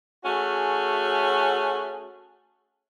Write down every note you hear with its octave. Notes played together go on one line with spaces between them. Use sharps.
A3 C#4 F#4 G#4